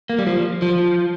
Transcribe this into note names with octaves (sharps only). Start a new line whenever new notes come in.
A#3
G3
F3
F3